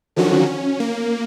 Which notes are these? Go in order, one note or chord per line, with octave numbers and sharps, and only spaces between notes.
D3 D#3 F3 F#3 C#4 F#4
C#4
A#3